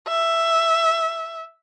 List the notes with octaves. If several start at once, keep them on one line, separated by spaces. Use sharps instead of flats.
E5